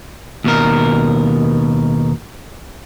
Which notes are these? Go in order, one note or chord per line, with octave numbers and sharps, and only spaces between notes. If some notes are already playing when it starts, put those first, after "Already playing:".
D#2 B2 A#4